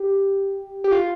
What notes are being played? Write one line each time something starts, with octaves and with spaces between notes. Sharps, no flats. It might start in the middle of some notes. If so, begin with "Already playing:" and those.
Already playing: G4
G4
F4